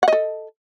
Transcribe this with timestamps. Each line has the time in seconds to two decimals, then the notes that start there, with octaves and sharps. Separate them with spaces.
0.03 F#5
0.08 D#5
0.13 A4